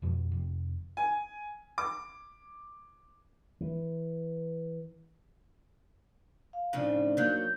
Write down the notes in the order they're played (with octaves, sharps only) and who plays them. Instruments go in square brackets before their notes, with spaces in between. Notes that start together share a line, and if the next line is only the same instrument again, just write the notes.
[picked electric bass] F2 B2 F3
F1 C3
[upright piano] G#5
D6
[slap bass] E3
[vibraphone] F5
[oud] A2 C#3 F3 [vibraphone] D4 D#4 D5
[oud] F#3 A#3 [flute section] G6